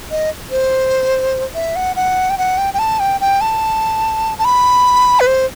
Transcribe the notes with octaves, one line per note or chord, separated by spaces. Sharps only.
D#5
C5
E5
F#5
F#5
G5
F#5
G5
G5
A5
G5
G5
A5
A5
B5
B4
C5